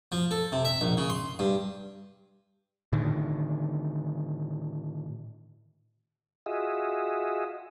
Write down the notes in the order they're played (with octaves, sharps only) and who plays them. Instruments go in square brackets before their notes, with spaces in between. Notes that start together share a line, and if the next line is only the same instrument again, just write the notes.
[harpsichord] F3
A4
C3
E5
A#1
C#3
C6
G2
[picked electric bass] A2 D3 D#3
[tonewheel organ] F4 F#4 G#4 D#5 E5